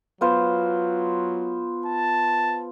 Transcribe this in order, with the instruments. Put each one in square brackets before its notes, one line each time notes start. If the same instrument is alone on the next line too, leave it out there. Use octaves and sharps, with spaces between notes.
[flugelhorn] F#3 [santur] B3 F4 C5
[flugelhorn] A5